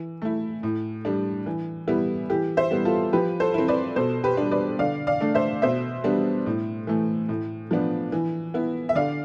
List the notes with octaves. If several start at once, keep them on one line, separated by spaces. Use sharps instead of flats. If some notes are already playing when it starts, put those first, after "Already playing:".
Already playing: E3
A3 E4
A2
G3 D4
E3
G3 B3 E4
E3 G4
C5 E5
G3 B3 E4
F4 A4
F3 G4 B4
A4 C5
C4 E4
B4 D5
B2 A4 C5
G4 B4
G3 D4
B4 D5
D3 D5 F5
D5 F5
A3 D4
C5 E5
B2 C5 E5
G3 B3 D4
A2
E3 A3
A2
F3 B3 D4
E3
B3 E4
E5
D3 D5 F5